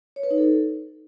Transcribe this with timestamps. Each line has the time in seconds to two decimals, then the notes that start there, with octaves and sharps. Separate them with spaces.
0.16 C#5
0.23 B4
0.31 D#4
0.38 A4